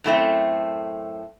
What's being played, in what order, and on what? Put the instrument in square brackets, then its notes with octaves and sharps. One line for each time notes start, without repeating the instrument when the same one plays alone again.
[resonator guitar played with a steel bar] F#2 A2 A3 C4